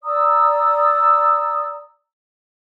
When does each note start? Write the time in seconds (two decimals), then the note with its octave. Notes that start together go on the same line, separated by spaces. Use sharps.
0.04 D5 A#5 D#6 E6